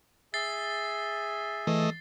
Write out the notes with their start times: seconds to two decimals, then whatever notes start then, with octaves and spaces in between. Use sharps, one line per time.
0.34 G#4 E5 A6 C7 G7
1.67 E3 A3 D#5